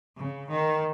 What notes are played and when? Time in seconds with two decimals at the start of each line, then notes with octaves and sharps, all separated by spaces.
0.17 C#3
0.49 D#3